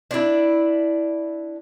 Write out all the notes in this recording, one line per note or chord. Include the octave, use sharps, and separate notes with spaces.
D4 E4